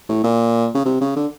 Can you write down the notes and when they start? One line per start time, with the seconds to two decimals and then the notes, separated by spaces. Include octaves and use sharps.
0.09 A2
0.24 A#2
0.75 C#3
0.85 C3
1.01 C#3
1.16 D3